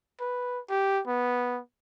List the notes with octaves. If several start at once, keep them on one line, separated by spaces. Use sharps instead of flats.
B4
G4
B3